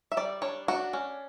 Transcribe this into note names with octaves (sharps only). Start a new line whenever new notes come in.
E5
G3 D5
D4 C#5
D4 F#4
C#4